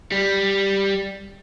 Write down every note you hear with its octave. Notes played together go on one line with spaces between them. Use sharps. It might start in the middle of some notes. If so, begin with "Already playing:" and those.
G3